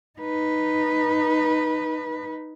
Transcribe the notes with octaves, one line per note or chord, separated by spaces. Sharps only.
D#4 B4